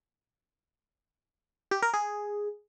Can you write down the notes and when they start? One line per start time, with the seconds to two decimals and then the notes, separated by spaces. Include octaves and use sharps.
1.71 G4
1.82 A#4
1.94 G#4